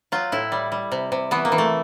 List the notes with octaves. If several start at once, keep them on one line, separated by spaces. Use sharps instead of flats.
F#3 F4
A2 E4
G3
G3
C3
C3
E3 B3
A#3
E3
A3